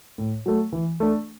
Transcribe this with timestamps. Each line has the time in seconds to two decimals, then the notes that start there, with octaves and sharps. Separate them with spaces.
0.18 A2
0.46 F#3 A3
0.73 E3
1.00 A3 D4